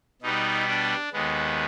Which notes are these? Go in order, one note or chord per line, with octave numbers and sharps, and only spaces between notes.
B2 G3 B3 D#4
D4
D#2 D#3 G#3 B3